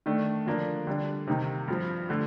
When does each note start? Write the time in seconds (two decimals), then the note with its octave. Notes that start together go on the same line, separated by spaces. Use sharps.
0.06 D#3 A3 D4
0.46 D3 F3 A#3 D4
0.87 D3 G3 D4
1.27 C3 D#3 A#3 D#4
1.68 G2 F3 C4
2.09 D3 A3